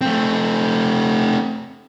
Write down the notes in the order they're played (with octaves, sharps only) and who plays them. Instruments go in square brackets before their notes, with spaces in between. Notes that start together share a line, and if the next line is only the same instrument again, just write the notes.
[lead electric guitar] A3 C4